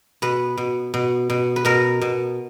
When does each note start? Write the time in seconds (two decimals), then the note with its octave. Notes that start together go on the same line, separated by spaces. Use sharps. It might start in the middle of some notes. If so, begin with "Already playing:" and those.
0.22 B2 B4
0.57 B2
0.94 B2
1.30 B2
1.56 B4
1.65 B2 A#4
2.01 B2